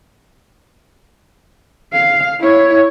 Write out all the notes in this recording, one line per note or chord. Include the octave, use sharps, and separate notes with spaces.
F5
E4 C#5